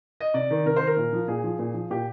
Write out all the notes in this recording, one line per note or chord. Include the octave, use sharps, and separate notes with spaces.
D#5
C3 D5
D#3
C3 A#4
C5
D#3
A#4
A#2
F3
A#2 G#4
F3
A#2
F3
A#2 G4